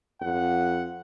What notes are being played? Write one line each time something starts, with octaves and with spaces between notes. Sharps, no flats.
F2 F#5